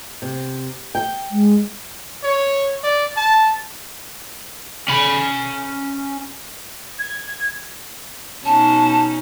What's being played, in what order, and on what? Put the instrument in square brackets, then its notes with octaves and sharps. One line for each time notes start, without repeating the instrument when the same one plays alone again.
[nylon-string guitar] C3
G5
[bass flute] G#3
[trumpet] C#5
D5
A5
[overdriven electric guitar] C#4 B5
[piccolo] G#6
[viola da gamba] B2 C#4 D#4 [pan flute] A5